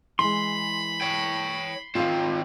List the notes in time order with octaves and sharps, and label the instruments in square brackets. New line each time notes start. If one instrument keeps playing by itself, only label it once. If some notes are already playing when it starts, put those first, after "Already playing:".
[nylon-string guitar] E3 G#3 [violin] B5 [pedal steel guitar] C6
[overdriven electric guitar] C#5 G5
[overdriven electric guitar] D#3 C4 [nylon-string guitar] F4 F5